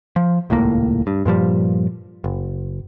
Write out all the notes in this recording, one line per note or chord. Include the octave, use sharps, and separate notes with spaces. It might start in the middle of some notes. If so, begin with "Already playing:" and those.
F3
D#1 C#2 A2 A#3
G2
G2 A#2 F3 G3
F#1